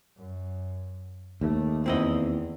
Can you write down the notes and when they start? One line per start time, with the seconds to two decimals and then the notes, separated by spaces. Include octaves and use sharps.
0.16 F#2
1.41 D#2 A3
1.86 E2 C4 E4 D#5